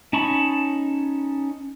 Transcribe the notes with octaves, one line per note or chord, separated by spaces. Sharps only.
C#4 D#4 A5 B5 C#6